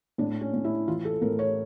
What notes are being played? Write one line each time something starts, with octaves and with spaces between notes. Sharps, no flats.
A2 D4
C#4
A2
E4
E3 F4
A4
A2 A#4
C#5